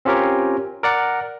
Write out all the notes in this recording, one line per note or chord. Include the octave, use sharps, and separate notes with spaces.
C4 C#4 F4 G4 A#4 C#5
A#4 D5 F#5